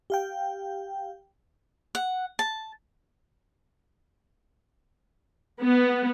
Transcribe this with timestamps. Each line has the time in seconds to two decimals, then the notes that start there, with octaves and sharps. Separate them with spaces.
0.10 G4 F5 G5
1.95 F#5
2.39 A5
5.62 B3